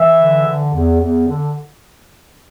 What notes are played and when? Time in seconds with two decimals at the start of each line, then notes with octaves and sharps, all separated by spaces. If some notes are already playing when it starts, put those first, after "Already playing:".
Already playing: E3 E5
0.19 D3
0.46 D3
0.73 E2
1.00 E2
1.27 D3